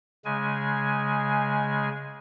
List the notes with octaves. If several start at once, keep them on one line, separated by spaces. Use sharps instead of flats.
C#3 G#3 G#5